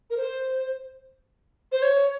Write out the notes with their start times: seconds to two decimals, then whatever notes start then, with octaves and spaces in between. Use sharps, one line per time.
0.10 A#4
0.17 C5
1.72 C5
1.82 C#5